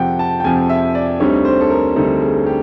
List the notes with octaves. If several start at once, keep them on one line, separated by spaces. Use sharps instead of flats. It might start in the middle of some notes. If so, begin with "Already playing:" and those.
Already playing: F2 C3 F3 F#5 G5
A5
G5
F2 C3 F3 G#5
E5
D5
D2 D3 G3 C4 D#4 C#5
C5
A4
A#4
D2 D3 G3 C4 D#4 A4
G#4
G4